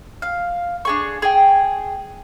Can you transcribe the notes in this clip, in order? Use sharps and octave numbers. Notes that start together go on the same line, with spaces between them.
F5
D4 G#4 C#6
G#4 G5